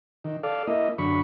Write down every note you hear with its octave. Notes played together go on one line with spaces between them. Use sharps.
D#3
A4 D5 F5
A#3 E4 D#5
F#2 D3 B5 C#6